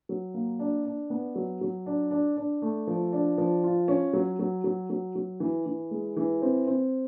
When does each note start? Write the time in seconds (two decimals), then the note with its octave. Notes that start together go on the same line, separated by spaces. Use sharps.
0.09 F#3
0.34 A#3
0.59 D4
0.85 D4
1.10 B3
1.35 F#3
1.61 F#3
1.86 D4
2.11 D4
2.37 D4
2.62 A3
2.87 F3
3.12 D4
3.38 F3
3.64 F4
3.88 C#4
4.13 F#3
4.39 F#3
4.64 F#3
4.90 F#3
5.15 F#3
5.40 E3
5.66 E3
5.91 G#3
6.17 E3
6.42 C4
6.67 C4